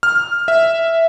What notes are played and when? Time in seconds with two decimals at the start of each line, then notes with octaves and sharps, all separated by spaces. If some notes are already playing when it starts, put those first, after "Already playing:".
0.03 F6
0.48 E5